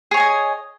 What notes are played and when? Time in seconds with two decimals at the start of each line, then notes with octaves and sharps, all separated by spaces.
0.11 G#4
0.14 C#5
0.17 G#5
0.20 D#5